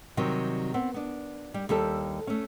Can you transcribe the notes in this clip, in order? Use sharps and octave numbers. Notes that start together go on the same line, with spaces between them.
C3 D#3 F#3 G3
B3 C4
B3 D4
G3 G4
D#2 G3 G4 A4
A3 C#4